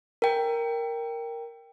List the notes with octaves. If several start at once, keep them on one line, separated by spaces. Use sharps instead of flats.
A#4 G5